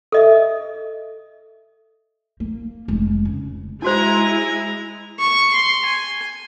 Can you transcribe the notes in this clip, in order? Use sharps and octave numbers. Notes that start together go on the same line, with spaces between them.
A4 D#5 E5
A#3
F1 G#3
C#3
G#3 D#4 E4 F#4 C5 G#5 A#5
C#6
C6
G#5